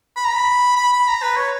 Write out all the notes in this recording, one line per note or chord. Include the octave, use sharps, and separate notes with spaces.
B5
A#5
B5
B5
B5
A#5
B4
C#5